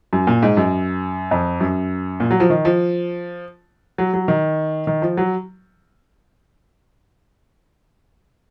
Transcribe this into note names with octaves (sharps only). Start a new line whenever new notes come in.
F#2
A#2
G#2
F#2
F2
F#2
A#2
F#3
F3
D#3
F3
F#3
F#3
D#3
D#3
F3
F#3